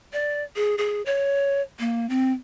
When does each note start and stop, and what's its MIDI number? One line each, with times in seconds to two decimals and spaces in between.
0.13 0.43 74
0.56 0.75 68
0.78 1.02 68
1.06 1.61 73
1.79 2.08 58
2.09 2.32 60